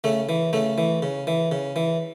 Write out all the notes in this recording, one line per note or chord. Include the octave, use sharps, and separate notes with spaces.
C#3 A3
E3
C#3 A3
E3
C#3
E3
C#3
E3